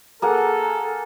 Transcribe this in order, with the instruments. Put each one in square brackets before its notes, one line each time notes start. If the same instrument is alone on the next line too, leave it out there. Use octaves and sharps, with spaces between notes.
[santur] A#3 G#4 F#5 [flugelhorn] A4